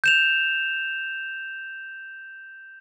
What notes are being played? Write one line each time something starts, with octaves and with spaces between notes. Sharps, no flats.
G6 E7 F7